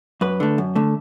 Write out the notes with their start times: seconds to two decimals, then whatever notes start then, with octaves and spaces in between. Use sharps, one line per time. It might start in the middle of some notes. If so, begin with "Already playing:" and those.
0.21 F#2 B4
0.40 D3 A3
0.58 F#2
0.75 D3 A3